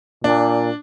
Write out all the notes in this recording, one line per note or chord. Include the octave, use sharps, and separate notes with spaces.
A#2 D4